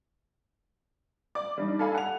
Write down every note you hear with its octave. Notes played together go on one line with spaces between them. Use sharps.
D5 D6
G3 D4 D#4
A4 F5 G#5 B5
F#5 F7